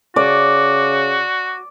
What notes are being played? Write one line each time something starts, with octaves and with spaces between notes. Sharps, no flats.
C#3 F#4 D5